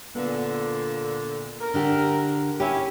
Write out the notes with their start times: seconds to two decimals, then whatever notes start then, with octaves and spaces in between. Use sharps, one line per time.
0.15 A#2 D3 B3
1.61 A#4
1.74 D3 D4 G4
2.60 C#4 E4 G4